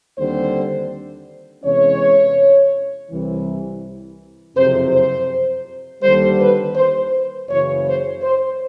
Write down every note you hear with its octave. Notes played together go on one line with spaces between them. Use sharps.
D#2 D3 G3 C4 C5
E2 C3 E3 G#3 C#4 C#5
C2 C3 E3
F#1 F2 C3 C5
C5
D#2 D3 G3 C5
B4
C5
F#1 F#2 C#3 E3 C#5
C5
C5